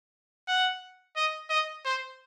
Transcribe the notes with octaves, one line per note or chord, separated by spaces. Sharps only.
F#5
D#5
D#5
C5